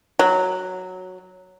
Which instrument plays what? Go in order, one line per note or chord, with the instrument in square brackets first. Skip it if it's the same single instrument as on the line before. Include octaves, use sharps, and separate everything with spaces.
[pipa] F#3